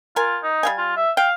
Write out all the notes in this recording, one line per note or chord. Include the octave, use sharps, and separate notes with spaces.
F4 A#4 G#5
D#4
G3 F5 G#5
F4
E5
F5 G5